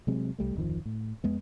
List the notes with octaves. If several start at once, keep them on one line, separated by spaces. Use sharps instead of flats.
C3 F#3 G#3 C4
C2 G3 A3
D1 F2 D#3 F3
A2
F2 G#3 B3